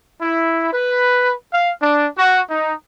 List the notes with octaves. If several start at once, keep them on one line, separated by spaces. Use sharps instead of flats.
E4
B4
F5
D4
F#4
D#4